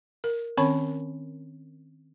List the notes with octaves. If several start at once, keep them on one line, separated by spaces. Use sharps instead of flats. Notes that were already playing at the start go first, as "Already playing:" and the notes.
A#4
D#3 C4 C#4 C#5 B5 C#6